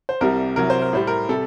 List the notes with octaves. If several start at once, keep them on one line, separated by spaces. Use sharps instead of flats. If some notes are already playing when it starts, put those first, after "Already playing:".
C5
C2 C3 G3 A#4
C2 C3 F#3 A#4
C5
A#4
A2 G3 C5
A#4
C3 G3 A4